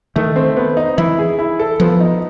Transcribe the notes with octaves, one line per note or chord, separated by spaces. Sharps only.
D#3 A3
C4
B3
D#4
E3 E4
G#4
E4
A4
F3 B3
D#4